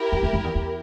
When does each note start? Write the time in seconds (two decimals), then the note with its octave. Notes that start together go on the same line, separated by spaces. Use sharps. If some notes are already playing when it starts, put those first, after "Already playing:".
Already playing: E4 G4 A#4
0.12 F2
0.23 E2
0.33 F2
0.44 E2
0.55 E2